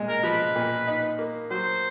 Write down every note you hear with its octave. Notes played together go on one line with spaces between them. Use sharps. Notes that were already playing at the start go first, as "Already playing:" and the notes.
Already playing: A#2 G#3
A#4
F3 B4
A#2
D#4
A#3
F#3 C5